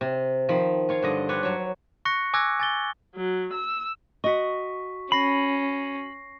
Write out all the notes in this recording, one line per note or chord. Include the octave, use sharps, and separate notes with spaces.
C3
D#3 F3 F5 B5
F4 C#5 F5
G2 D3 D#5
C4 D4 B4 C#5
F#3 C#5
C#6 F#6 A#6 C#7
G#5 D6 E6 F#6 G#6 A#6
G#5 A6 G7
F#3
E6
F#4 D#5 C#6 B6
C#4 B5 A#6 C7